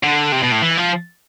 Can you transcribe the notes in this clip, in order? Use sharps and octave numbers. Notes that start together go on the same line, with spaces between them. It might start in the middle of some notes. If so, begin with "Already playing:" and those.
D3
C3
B2
A2
E3
F3